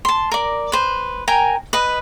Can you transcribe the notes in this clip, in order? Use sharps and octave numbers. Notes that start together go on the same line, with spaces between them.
A5 C6
A#4 D5
B4 C5
A#4 G5 G#5 A#5
B4 D#5